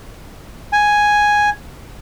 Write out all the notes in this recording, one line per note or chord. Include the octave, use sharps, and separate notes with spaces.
G#5